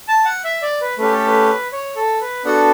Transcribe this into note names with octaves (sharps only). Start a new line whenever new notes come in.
A5
F#5
E5
D5
B4
A3 C#4 G4 B4
A4
B4
C#5
A4
B4
B3 D4 F#4 A4 F#5